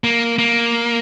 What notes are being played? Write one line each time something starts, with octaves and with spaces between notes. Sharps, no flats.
A#3
A#3